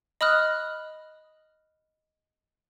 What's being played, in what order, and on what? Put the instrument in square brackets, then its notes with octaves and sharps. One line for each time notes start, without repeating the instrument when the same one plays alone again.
[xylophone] D#5 B5 D#6 F6 F#6